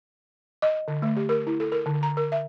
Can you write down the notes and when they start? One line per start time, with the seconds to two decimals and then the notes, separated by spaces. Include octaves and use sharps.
0.62 D#5
0.88 D3
1.02 A3
1.16 G4
1.29 A#4
1.47 E4
1.60 A4
1.72 A#4
1.86 D3
2.03 A#5
2.17 A#4
2.32 E5